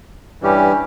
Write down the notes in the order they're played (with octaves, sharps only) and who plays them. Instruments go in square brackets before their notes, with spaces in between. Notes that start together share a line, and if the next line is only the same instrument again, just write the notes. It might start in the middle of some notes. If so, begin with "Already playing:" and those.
[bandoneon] G2 E3 G3 C#4 G4